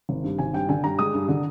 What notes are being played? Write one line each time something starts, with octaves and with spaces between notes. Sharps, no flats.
G#1
G2
G#1 G#5
G2 G5
D3 G#5
G2 A#5
G#3 D#6
G2
D3